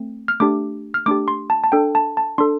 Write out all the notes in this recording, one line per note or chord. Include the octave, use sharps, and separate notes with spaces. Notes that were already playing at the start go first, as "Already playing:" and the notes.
Already playing: A3 C4
F6
A3 D4 G4 D6
F6
A3 D4 G4 D6
C6
A5
A5
D4 A4 G5
A5
A5
D4 A4 C6